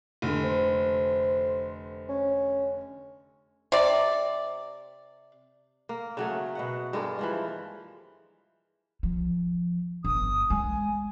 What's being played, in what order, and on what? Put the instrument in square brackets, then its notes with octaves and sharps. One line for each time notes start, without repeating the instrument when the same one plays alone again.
[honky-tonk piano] F1 D3
[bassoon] C5
C#4
[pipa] C3 D5
[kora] A#3
C#3 F#3 A3
B2 D#5 F#5
G2 G#3 A#3 A4
E3 F3 G#3
[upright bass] F3
[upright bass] G1 [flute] D#6
[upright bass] G#3 [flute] G#5